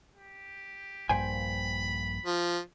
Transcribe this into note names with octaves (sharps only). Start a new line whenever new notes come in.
G4
A#1 G2 A#2 C5 G5 G#5 B5
F3